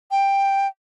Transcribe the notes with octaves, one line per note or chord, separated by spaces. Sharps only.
G5